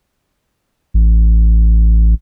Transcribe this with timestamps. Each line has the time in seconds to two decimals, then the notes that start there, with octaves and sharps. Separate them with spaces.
0.94 A1